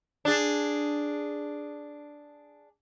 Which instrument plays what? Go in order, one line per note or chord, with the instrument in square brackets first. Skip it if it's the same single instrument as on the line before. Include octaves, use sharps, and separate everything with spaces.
[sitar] D4 G#4